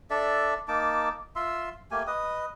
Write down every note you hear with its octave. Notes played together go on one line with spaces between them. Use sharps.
D4 A4 D5 E5
A#3 D#4 A5 D6
F4 E5 C6 E6
A3 A#3 G4 G#5
B4 D#5 D#6